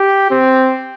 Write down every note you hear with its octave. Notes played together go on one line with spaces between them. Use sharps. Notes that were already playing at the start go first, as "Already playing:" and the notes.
Already playing: G4
C4